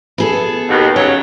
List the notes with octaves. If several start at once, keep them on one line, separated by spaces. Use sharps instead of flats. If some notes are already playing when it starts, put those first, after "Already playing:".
B3 G#4 A4
D#2 B2
C#3 F#3 C#5